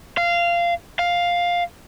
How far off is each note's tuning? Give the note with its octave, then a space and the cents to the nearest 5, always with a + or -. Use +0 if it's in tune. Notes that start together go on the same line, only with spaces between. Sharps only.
F5 -15
F5 +5